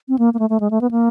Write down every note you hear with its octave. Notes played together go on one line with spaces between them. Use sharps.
C4
A#3
A#3
A3
A3
G#3
A3
B3
A#3